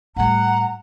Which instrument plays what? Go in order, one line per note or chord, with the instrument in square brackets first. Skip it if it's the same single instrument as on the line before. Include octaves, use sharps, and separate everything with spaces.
[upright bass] A2 G3 [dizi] F#5 [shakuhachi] A#5